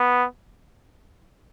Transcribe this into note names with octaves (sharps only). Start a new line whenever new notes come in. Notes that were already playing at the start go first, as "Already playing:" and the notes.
Already playing: B3